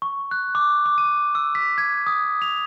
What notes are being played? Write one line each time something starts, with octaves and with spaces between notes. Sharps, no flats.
C#6
F#6
D6
D6
D#7
E6
B6
G#6
D#6
F7